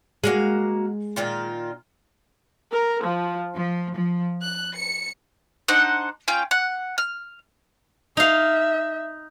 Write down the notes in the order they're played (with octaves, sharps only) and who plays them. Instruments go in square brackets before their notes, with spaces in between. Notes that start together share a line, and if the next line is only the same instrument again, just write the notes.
[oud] G#3 [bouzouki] A#3 F#4 F5
[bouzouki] A#2 D#3 F4
[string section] A#4
F3
F3
F3
F#6
C#7
[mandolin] D4 D#4 C5 F#5
C#4 F4 G5
F#5
F6
[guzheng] D#4 F5 [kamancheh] E5